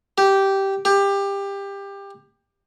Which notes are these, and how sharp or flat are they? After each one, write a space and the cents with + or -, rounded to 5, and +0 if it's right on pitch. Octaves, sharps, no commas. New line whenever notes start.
G4 -10
G4 +20